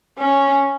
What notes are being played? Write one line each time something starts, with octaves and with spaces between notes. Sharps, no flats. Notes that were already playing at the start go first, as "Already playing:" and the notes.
C#4